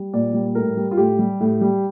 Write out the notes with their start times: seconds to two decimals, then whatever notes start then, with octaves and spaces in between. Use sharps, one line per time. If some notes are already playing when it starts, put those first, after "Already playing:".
Already playing: G3
0.13 A#2 D5
0.34 G3
0.55 A2 A#4
0.77 G3
0.91 F4
0.97 A2 G4
1.19 G3
1.40 A2
1.61 G3